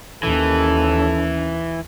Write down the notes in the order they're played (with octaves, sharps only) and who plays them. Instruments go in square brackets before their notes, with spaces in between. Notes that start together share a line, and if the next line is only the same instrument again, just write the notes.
[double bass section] D#2 [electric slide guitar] E3 [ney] C#4 [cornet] A4